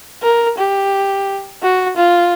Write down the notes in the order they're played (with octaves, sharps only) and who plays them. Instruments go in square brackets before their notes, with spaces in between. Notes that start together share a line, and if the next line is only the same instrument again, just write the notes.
[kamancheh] A#4
G4
F#4
F4